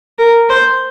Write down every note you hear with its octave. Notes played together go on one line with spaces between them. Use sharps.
A#4
C5